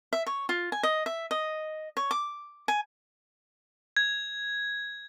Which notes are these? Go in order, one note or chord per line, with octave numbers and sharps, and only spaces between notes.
E5
C#5
F4
G#5
D#5
E5
D#5
C#5
D6
G#5
G#6